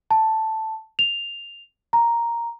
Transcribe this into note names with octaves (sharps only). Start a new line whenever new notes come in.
A5
F7
A#5